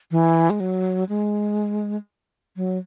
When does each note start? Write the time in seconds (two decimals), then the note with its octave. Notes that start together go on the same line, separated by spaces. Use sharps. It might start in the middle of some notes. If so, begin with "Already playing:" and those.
0.11 E3
0.50 G#3
0.60 F#3
1.09 G#3
2.56 F#3